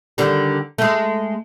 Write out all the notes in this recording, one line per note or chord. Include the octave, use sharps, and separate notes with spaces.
D3 D#3 G3
G#3 A3